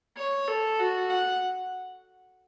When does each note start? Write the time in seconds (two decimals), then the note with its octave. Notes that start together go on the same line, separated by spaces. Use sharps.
0.17 C#5
0.48 A4
0.79 F#4
1.09 F#5